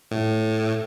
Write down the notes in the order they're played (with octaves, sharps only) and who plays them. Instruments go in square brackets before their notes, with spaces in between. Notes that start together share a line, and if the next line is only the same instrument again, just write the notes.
[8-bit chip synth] A2